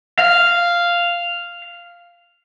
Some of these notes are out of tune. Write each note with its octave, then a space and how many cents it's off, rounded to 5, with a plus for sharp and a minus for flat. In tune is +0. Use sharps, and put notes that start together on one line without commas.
F5 -5